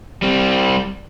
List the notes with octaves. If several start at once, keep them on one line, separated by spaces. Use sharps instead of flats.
G3 C4